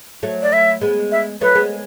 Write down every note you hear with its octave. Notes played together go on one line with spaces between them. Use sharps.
F#3 A3
D5
E5
G#3 B3
E5
F#3 A3 B4
G#3 B3